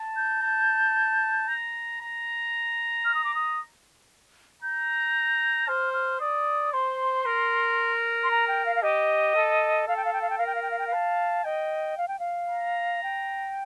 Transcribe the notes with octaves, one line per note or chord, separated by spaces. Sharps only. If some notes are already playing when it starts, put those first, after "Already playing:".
Already playing: A5
G6
A5
A#5
A#5
F6
D#6
D6
D#6
A#5 G6
C5 F6
F6
D5 D#6
C5 C6
A#4
C6
A#5
G5
F5
F5
G4 D#5
A4
A4 F5
G5
F5
G5
F5
G5
A#4 F5
G5
F5
G5
F5
G5
F5
A5
D#5 G5
F5
G5
F5
A#5
G5